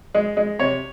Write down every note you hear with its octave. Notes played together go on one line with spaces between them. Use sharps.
G#3
G#3
C3 C#5